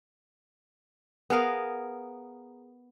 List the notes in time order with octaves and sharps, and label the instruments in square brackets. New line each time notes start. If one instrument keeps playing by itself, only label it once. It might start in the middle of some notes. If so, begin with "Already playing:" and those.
[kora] B3 G#4 A#4 F5